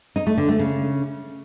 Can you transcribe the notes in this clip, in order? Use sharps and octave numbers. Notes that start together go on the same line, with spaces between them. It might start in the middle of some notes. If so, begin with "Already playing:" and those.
D#4
A3
D3
A3
C#3